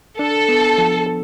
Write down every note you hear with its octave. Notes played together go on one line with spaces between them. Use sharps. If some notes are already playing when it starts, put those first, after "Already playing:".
D4 A4
B3
F3
A4